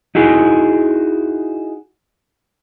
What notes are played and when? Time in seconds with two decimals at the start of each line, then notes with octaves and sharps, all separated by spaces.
0.15 D#4 E4 F#4 G#4